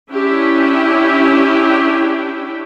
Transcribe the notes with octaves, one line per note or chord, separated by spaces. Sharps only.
C#4 D4 E4 G4 E5 G5